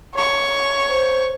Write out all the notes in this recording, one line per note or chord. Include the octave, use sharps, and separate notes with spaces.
C#5 C#6
C5